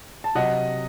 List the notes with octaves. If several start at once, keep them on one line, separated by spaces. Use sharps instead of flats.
A5
C3 F#3 D#5 F#5